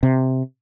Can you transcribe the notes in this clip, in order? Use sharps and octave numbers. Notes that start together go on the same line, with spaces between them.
C3